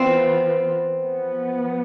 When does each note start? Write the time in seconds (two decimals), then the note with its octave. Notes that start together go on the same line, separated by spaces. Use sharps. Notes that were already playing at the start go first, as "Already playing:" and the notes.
Already playing: E3 B3 C4 F4 B4
1.01 F3 B3